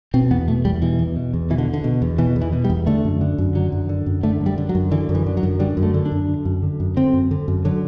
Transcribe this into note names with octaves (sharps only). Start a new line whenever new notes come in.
B2 C4
E2 B3
B2 A3
E2 G3
B2 E3
E2
B2
E2
B2 E3
D3
E2
D3
B2
E2
B2 E3
E2
E3
B2
G3
E2
D3 A3
F#2
D3
F#2
D3 F#3
F#2
D3
F#2
D3 A3
F#2
G3
D3
F#3
F#2
D3 E3
F#2
E3
D3
F#3
F#2
D3 G3
F#2
A3
D3
D4
F#2
D3
F#2
D3
F#2
D3 C4
F#2
D3
F#2
D3 F#3